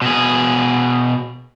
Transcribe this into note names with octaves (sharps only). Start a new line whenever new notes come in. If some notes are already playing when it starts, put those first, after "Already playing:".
B2 G#4